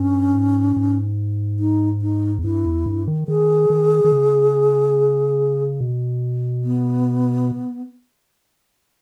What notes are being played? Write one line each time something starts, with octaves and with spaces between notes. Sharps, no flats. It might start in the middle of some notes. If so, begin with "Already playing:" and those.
Already playing: G2 C#4
G#2
G#2
D#4
D#4
E2
G2 E4
E2
G2
D#3
D#3 G#4
D#3
D#3
C#3
B2
B3